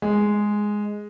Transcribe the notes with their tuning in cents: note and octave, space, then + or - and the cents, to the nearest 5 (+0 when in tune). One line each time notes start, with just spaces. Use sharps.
G#3 +0